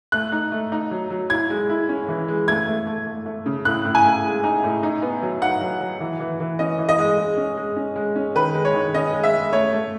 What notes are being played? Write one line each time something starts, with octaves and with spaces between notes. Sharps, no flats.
A3 F#6
D#4
A3
D#4
F#3
F#3
E4 G#6
G#3
E4
C#4
E3
G#3
A3 G#6
A3
A3
A3
A3
C#3
A2 F#6
A2
G#5
A2
G#3
D#4
A2
D#4
B3
F#3
D#4 F#5
F#3
F#3
E3
E3
E3
C#4 D#5
E3
D#5
G#3
G#3
C#4
G#3
C#4
G#3
C#4
D#3 B4
G#3
C#5
D#3
C#4 D#5
G#3
E5
G#3
A3 C#5
A3